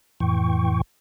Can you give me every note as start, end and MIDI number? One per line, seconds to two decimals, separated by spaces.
0.20 0.81 41
0.20 0.81 45
0.20 0.81 52
0.20 0.81 79
0.20 0.81 85